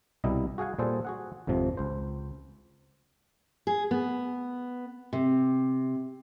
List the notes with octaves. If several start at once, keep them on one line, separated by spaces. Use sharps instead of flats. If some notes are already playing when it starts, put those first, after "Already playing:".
C2 B2 G3 E4 D#5
F#4 G#4 F5 F#5 G#5
A#2 G3 G#4 A4 C5
F#4 G#4 F#5
G#1 F2 C3 F3
C#2 C5
G#4
B3
C3